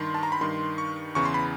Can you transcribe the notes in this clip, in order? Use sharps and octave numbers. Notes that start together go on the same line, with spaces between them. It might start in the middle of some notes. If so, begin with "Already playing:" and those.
Already playing: G2 D#3 C6
A5
A#5
B5
G2 D#3 C6
C#6
E2 C#3 E3 C#6
C6
B5